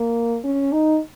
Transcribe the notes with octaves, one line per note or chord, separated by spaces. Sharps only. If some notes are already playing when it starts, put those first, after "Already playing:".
Already playing: A#3
C#4
D#4